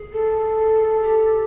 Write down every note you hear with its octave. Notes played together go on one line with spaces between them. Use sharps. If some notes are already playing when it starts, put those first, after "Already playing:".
Already playing: G#4
A4
G4